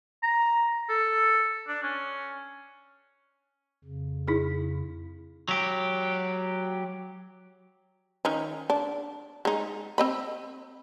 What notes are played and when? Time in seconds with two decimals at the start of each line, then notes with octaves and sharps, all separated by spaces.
0.23 A#5
0.89 A4
1.68 D4
1.83 C#4
3.84 F2 C#3
4.28 D#4 E4 G#4
5.48 F#3 G4
8.25 D#3 C#4 D#4
8.70 D4
9.45 G#3 D#4
9.98 C4 D#5 B5